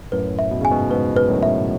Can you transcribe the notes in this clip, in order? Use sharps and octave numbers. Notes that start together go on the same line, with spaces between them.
F#2 A2 B4
E5
B2
C#3 G#5
G#2 B2
G#2 B2 B4
B4
F#2 A2
E5